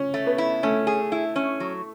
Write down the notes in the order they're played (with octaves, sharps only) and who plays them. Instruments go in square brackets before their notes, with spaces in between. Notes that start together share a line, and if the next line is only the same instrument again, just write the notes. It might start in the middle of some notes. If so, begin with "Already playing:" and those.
Already playing: [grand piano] C#4
[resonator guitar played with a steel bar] A3
[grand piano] B3
[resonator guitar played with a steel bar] E4
[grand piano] A3 [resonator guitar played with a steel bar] C#4
[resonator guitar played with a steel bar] G#4
E4
C#4
F#3